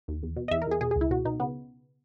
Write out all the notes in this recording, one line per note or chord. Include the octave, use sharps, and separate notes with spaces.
D#2
E2
B2
D#5
E2 E5
A#4
E2 G#4
B2 G#4
G#4
C#2
E4
B2 F#4
B2 D#4
C#3 B3